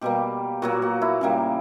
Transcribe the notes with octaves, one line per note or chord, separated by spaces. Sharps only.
B2 G3 A#3 G4
A#2 F#3 A#3 F#4
F#4
E4
C#3 G3 A#3